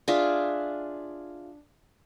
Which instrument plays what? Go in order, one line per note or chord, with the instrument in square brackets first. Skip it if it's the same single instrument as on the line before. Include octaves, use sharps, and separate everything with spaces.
[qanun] D4 F4 G#4 E5